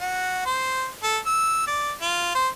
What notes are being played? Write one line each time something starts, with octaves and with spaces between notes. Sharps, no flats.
F#4
C5
A4
E6
D5
F4
C5